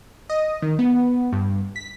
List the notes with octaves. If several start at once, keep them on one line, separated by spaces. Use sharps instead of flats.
D#5
D#3
B3
G2
B6